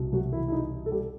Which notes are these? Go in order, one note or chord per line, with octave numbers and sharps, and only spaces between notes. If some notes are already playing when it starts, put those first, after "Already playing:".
Already playing: C2 B2
F#3 F#4
E3 E4
E4
D#4
A4
G3 G4